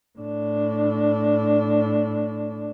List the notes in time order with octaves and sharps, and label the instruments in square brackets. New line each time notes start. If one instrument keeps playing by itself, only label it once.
[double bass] A2 D4